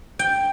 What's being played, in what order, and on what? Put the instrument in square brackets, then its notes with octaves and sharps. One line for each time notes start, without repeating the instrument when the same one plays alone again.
[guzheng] G5